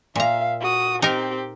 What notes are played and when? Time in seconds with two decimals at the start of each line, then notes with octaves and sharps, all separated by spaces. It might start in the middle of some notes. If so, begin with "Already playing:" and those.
0.16 A#2 E5 F5 A#5
0.61 F#4 D#6
1.02 C4 D#4 G4 A#4